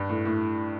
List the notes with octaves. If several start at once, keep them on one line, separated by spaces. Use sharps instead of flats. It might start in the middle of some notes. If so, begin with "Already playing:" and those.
Already playing: G2
A2
A2